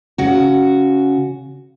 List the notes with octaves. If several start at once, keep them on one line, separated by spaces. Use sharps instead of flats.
C#3 F#4